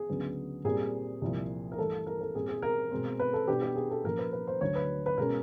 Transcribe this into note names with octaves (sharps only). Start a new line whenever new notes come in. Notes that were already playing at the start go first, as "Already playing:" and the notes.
Already playing: G#4
D2 C#3 F#3 B3 D4
A#2 G3 C4 G#4
C2 A#2 F3
A#4
G2 E3 A3 A4
A#4
A4
A#2 G3 C4 G#4
G#4
A#4
B2 G#3 C4
B4
A4
B2 G3 B3 D4 G4
G4
G#4
A4
A#2 F3 A#3 C#4 A#4
B4
B4
C5
D2 D3 F#3 C#5
B4
B4
B2 G#3 C#4 A#4